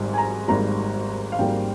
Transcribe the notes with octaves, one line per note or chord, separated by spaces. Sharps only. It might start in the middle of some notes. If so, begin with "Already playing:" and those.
Already playing: G#1 G#2 G3
G#5
A#5
G#1 G#2 G3 A#3 A#5
F5
G#1 G#2 G3 A#3 G5